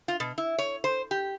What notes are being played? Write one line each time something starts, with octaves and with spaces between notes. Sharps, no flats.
F4
B2
E4
C#5
C5
G4